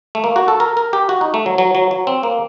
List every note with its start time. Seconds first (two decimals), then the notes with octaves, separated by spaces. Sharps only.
0.15 A3
0.24 A#3
0.36 F#4
0.48 A4
0.60 A#4
0.77 A#4
0.93 G4
1.09 F#4
1.21 D#4
1.34 A3
1.46 F#3
1.58 F#3
1.75 F#3
1.91 F#3
2.07 C4
2.23 A#3